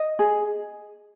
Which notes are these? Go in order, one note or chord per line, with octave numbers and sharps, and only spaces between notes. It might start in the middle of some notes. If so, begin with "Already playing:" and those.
Already playing: D#5
G#4